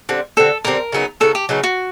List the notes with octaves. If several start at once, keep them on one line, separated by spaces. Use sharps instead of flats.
D3 G3 C4
D3 G3 C4 A4
D3 G3 C4 A#4
C#3 F#3 B3 D#4
C#3 F#3 B3 D#4 A4
G4
C#3 F#3 B3 D#4
F#4